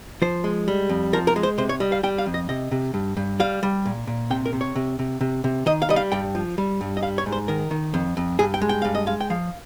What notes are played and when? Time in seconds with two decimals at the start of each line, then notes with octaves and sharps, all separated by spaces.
0.22 F3 C5
0.44 G#3
0.68 G3
0.89 F2
1.13 F3 A#4
1.27 A#4
1.36 G#3
1.43 C5
1.58 C3 C5
1.69 C#5
1.80 G3 D#5
1.92 F5
2.03 G3 G5
2.18 F5
2.26 F2
2.34 D#5
2.49 C3 D#5
2.71 C3
2.94 G2
3.17 G2
3.40 G3 F5
3.63 G3
3.86 A#2
4.07 A#2
4.30 C3 G5
4.46 A#4
4.53 C3
4.61 C#5
4.76 C3
4.99 C3
5.21 C3
5.44 C3
5.66 D#3 D#5
5.82 F5
5.89 G3 D#5
5.96 F5
6.12 G2 G5
6.35 F3
6.58 G3
6.81 G2
6.97 D#5
7.02 G3 F5
7.18 C#5
7.26 G#2
7.32 C5
7.48 D#3 A#4
7.71 D#3
7.94 F2
8.17 F2
8.39 G2 G#4
8.54 G5
8.62 G#3
8.69 G5
8.82 G2 F5
8.95 D#5
9.06 G#3 F5
9.21 G5
9.30 F3 F5